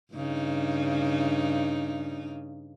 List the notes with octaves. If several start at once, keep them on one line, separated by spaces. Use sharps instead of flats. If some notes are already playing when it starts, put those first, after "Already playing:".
G2 C#3 D#4